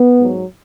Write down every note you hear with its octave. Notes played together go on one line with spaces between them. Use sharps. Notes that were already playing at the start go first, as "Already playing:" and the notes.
Already playing: B3
G#2 F#3